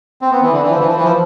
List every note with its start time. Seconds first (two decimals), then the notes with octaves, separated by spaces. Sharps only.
0.21 C4
0.31 B3
0.42 E3
0.52 D3
0.63 E3
0.70 F3
0.79 E3
0.88 F3
0.96 E3
1.04 F3